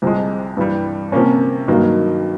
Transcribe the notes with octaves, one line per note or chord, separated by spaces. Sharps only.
C2 C3 F3 G#3
G2 E3 G3
C3 F3 A#3 C#4
G2 D#3 F#3 A#3